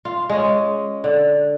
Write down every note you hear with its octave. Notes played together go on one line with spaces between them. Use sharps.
F4
G#3 C#4
D3